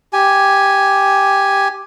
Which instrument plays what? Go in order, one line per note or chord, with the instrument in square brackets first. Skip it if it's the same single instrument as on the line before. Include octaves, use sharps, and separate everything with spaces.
[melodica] G4 G#5